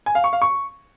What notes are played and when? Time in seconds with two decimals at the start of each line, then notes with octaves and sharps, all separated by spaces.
0.06 G#5
0.15 F5
0.24 C#6
0.33 F5
0.42 C#6